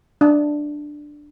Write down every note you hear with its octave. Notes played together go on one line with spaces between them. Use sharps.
D4